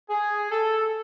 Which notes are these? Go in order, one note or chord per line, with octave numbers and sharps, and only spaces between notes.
G#4
A4